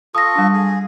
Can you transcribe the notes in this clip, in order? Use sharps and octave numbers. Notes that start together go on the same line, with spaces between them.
F4 A4 C#6 D#6 A#6
G3 D4
G#4 G#5